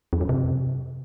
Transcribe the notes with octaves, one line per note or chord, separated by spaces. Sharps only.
F2
F#2
C3